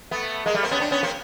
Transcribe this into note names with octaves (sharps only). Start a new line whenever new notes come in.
A3 B3
G#3 A#3
G3 A3
A#3 C4
B3 C#4
C4 D4
B3 C#4
A#3 C4